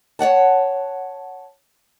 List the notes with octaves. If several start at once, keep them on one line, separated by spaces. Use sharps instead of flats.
C#5 D5 F#5 A5